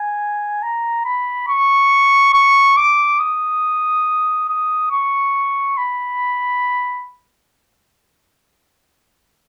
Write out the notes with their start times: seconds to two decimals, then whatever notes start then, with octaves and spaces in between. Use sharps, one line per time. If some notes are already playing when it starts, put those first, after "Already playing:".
Already playing: G#5
0.63 A#5
1.05 B5
1.48 C#6
2.34 C#6
2.77 D6
3.20 D#6
4.48 D#6
4.91 C#6
5.77 B5